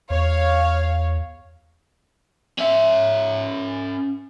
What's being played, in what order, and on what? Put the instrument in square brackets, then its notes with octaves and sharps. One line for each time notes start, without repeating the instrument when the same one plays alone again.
[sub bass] E2 [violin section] C#5 F5
[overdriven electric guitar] C#4 E5